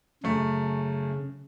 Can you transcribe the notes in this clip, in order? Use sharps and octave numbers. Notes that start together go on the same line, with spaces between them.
F#2 C#3 A3